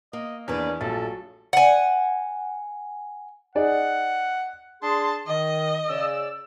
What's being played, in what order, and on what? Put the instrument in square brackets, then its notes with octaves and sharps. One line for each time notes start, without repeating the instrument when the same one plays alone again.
[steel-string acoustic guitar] A#3 [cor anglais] D#5
[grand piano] E2 [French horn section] D#3 D4 [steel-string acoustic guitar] A#3 B4 D5 [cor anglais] C#4
[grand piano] A#1 A6 [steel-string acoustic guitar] F#3 [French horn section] G3 A3 F4 [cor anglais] A4
[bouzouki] F#5 G#5
[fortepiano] D#4 G#4 D5 [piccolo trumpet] F#5
[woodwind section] D4 G#4 C6 [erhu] A5
[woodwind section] D#3 [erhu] D#5
[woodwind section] C#3 D5 E6